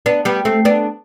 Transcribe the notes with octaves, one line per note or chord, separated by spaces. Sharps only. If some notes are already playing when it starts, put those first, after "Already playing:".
B3 D4
G3 B3
A3 C4
B3 D4